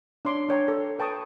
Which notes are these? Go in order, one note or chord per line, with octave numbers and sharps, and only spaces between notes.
D4 C#5 C6 D6
D4 C#5 G5 A#5
A4
B4 G5 A5 C#6 D#6